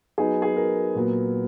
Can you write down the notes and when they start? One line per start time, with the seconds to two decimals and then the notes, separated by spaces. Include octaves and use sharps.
0.18 F#3 B3 D#4 G#4
0.42 G#4
0.57 A#4
0.95 A#2 F#3 B3